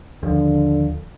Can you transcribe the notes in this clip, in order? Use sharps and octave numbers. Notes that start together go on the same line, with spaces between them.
D#2 D3 F3